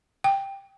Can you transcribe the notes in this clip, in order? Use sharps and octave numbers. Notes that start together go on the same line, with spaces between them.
G5